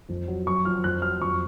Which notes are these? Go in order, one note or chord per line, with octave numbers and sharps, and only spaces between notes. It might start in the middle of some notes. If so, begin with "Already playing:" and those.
F2
F#3
F#2 C#6
F3 F6
F2 F#6
F#3 F6
F2 C#6